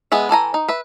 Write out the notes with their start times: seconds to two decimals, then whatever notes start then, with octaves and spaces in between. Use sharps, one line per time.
0.12 G#3 B3 G#4 E5
0.29 E3 A4 G#5 A#5
0.54 D#4
0.68 B4 E5